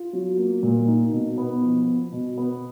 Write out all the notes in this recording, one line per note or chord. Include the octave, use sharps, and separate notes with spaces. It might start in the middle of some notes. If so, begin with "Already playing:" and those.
Already playing: F4
F#3
A#3
A#2
D#4
B2
B3
F3
B3
B2
B3